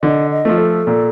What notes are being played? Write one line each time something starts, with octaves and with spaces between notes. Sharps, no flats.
D3 D#5
D#5
F3 A3
A4
A#2